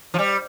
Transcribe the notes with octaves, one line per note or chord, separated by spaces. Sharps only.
F3
G3